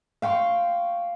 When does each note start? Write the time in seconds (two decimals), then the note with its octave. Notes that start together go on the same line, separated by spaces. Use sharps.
0.22 F5 G5 C6 C#6